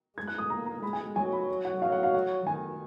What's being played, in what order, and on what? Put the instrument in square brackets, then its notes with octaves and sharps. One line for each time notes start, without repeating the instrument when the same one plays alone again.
[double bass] G#3 [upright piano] G#6
[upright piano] F#6
D#6
[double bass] A#3 [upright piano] A#5
[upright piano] A#5
[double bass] G#3 [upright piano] B5
[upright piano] G#5
[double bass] F#3 [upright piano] G#5
[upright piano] B5
F#5
[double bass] F#3 [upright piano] F5
[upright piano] F#5
F5
F#5
[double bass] D#3 [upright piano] G#5